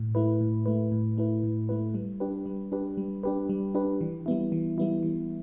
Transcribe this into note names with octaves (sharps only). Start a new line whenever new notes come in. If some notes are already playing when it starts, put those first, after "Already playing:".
Already playing: A2
A3 E4 B4
A2
A3 E4 B4
A2
A3 E4 B4
A2
A3 E4 B4
G3
D4 G4 B4
G3
D4 G4 B4
G3
D4 G4 B4
G3
D4 G4 B4
E3
G3 B3 E4
E3
G3 B3 E4
E3